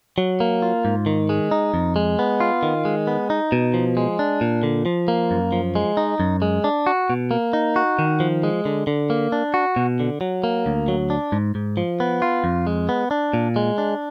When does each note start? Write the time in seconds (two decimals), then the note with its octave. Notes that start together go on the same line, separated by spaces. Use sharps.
0.18 F#3
0.40 A#3
0.62 F4
0.85 G#2
1.06 D#3
1.29 G#3
1.51 D#4
1.74 F2
1.96 G#3
2.19 B3
2.40 F4
2.63 D#3
2.85 G#3
3.07 B3
3.30 D#4
3.52 B2
3.74 F3
3.97 G#3
4.19 D4
4.41 A#2
4.63 D3
4.86 F3
5.08 A#3
5.31 F#2
5.52 F3
5.75 G#3
5.97 D#4
6.20 F#2
6.42 G#3
6.64 D4
6.87 F#4
7.10 B2
7.31 A#3
7.53 D#4
7.76 F#4
7.99 D#3
8.20 F3
8.43 G#3
8.65 D3
8.87 D3
9.10 A#3
9.32 D4
9.54 F#4
9.76 B2
10.00 D3
10.21 F#3
10.44 A#3
10.66 D2
10.88 F#3
11.10 D4
11.32 G#2
11.55 G#2
11.77 F3
12.00 B3
12.22 F4
12.44 F2
12.67 G#3
12.89 B3
13.11 D4
13.33 A#2
13.56 G#3
13.78 D4